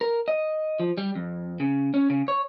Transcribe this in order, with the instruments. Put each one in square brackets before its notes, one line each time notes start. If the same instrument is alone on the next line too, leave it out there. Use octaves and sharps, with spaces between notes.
[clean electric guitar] A#4
D#5
F3
G3
F2
C#3
C#4
C#3
C#5